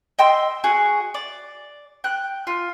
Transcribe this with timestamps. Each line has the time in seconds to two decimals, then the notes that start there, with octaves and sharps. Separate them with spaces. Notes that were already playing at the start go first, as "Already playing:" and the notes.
0.19 D#5 G5 C6 E6
0.64 F#4 G#4
1.14 D5
2.04 G5 F#6
2.47 F4